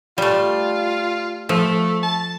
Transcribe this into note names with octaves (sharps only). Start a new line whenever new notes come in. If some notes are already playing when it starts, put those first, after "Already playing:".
G3 A3 F4
F3 A3
A5